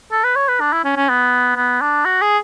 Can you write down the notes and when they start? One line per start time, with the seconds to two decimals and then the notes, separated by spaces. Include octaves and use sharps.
0.11 A4
0.24 B4
0.36 C#5
0.48 B4
0.60 D4
0.73 E4
0.84 C#4
0.96 C#4
1.09 B3
1.56 B3
1.81 D4
2.05 F#4
2.21 G#4